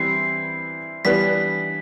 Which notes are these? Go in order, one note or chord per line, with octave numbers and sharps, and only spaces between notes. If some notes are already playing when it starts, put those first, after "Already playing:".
Already playing: E3 G3 C4 E4 C7
E3 G3 B3 D4 B6